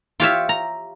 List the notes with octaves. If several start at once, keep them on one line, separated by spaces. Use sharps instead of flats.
F4 G4 C#5 E5
A#5